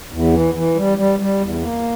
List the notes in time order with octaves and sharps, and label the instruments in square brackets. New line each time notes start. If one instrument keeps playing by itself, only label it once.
[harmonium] E2
E3
E3
G3
G3
G3
E2
A#3